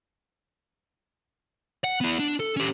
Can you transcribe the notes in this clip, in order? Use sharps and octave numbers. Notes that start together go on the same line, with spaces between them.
F#5
B3 E4
D4
A4
C#4 G4